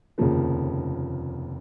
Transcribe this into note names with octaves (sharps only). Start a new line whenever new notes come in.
F1 D#2 C#3 F3 A#3